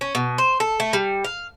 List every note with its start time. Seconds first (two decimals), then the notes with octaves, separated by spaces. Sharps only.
0.01 C#4
0.15 B2
0.38 C5
0.60 A4
0.80 A3
0.93 G3
1.24 F5